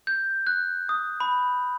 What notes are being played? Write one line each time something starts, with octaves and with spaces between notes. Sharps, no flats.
G6
F#6
D#6
B5